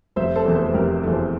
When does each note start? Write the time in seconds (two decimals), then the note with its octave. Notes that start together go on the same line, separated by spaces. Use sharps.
0.16 F1 C5 E5
0.36 A4 C5
0.45 E2 E3 A3
0.55 A4 C5
0.66 C5
0.74 F1 G4 A#4
1.03 E2 E3 A3
1.13 A4 C5